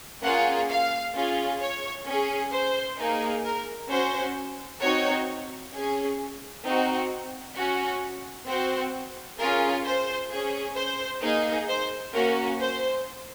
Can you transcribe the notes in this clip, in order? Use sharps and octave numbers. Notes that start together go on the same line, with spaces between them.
A#3 C#4 F4 G#4 F#5
F5
C#4 F4 G#4
C#5
C#4 G#4
C5
A#3 D#4 G#4
A#4
C#4 F#4 C5
C4 D#4 F#4 C#5
C#4 G#4
C4 D#4 F#4
C#4 F#4
C4 F#4 C5
C#4 F4 G#4 A#4
C5
C#4 G#4
C5
A#3 D#4 G#4
C5
A#3 C#4 F#4 A#4
C5